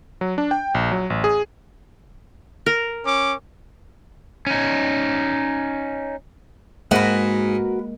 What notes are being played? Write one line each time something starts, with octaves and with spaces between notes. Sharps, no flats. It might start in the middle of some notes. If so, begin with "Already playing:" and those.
F#3
D4
G5
A#1
F#3
A1
G#4
A#4
C#4 D6
C#4 D#4
G#2 G#3 A#3 F#4 A#4 B4